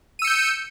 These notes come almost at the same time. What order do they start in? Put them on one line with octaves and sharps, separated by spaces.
D#7 E6 C#7 G6